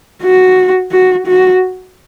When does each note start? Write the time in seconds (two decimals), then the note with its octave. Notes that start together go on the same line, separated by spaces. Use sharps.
0.23 F#4
0.92 F#4
1.27 F#4